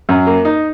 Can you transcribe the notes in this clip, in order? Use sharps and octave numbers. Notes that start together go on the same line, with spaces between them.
F#2
A#3
D#4